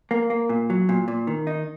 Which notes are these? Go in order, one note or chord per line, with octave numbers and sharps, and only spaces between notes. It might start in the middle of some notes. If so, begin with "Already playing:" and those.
A#3
A#3
A#2
F#3
A#2
A#2
D#3
D#4